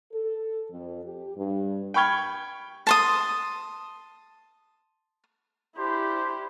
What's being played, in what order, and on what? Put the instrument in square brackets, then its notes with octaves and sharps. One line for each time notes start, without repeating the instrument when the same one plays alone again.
[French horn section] A4
F2
G4
G2
[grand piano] G5 B5 C#6 F6 G#6 G7
[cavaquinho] A5 C6 D#6
[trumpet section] D4 C5 [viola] E4 G4